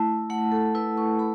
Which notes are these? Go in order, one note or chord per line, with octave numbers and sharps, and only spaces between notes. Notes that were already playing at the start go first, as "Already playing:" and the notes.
Already playing: A3 E4 A5
A3 F#5
A4
E4 B4
C#6
A3 B5